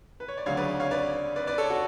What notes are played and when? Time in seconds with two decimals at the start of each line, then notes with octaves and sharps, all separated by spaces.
0.20 B4
0.28 C#5
0.37 D5
0.46 D2 C#3 F#3 C#5 F5
0.57 B4 D5
0.80 C#5 F5
0.91 B4 D5
1.36 B4 D5
1.47 B4 D5
1.58 A4 C#5
1.70 F#4